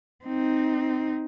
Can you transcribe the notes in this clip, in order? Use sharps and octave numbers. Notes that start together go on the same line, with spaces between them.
C4 D#4